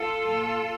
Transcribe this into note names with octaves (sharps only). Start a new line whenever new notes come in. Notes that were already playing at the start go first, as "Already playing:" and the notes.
Already playing: F4 A4
A#2 F3